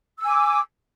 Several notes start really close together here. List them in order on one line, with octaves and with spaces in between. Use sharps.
E6 G#5 D6